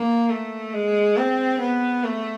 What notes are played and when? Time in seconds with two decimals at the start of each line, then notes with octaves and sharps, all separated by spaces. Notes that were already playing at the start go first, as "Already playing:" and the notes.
Already playing: A#3
0.30 A3
0.74 G#3
1.17 C4
1.61 B3
2.04 A3